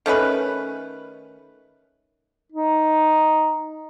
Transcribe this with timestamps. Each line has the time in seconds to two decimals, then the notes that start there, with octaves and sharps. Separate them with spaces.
0.06 D#3 A3 C#4 B4
2.52 D#4